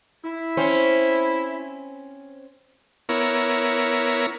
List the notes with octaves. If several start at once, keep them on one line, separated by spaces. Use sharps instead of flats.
E4
C4 C#4 C5
B3 E4 A#4 C#5